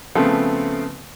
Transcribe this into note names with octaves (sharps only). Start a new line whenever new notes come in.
C#3 F3 A3 B3 C4